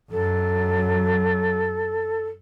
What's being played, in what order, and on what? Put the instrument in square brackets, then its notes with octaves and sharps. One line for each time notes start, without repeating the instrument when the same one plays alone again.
[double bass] F#2 F#3 [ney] A4